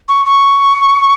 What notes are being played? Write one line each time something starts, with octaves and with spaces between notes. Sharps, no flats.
C#6
C#6